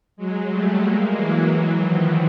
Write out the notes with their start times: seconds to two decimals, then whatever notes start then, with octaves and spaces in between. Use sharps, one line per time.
0.17 F#3 G#3
0.50 G3 A3
0.83 G#3 A#3
1.15 E3 F#3
1.49 E3 F#3
1.81 D#3 F3